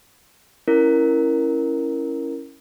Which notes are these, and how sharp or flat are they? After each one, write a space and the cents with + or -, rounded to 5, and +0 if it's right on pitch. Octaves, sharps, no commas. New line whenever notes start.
C#4 +0 E4 +0 A#4 +0